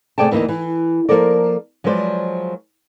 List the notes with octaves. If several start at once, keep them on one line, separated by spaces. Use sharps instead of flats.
C3 A3 G#4 D5 G5 A5
D2 E3 A#3 D#4 D#5
E3
F3 A#3 A4 A#4 D5
F3 F#3 G#3 B4 C5 D5